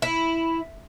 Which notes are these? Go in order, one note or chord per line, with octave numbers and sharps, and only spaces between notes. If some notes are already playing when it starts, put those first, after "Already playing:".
E4